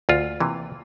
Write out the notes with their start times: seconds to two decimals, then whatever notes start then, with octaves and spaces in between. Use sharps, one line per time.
0.09 D2 F4
0.40 C3 E3 A#3